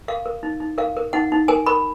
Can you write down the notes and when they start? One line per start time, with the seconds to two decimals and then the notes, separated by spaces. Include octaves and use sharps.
0.08 A#4 F5
0.26 A#4
0.43 D#4
0.60 D#4
0.78 A#4 F5
0.97 A#4
1.13 D#4 F#5
1.32 D#4
1.48 A#4 G#5
1.66 A#4 B5